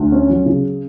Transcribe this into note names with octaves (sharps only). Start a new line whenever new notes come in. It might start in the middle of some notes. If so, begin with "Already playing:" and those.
Already playing: D2
C#4
F#3
C#3